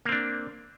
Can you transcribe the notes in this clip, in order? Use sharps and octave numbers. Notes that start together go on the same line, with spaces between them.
A#3 C4 D4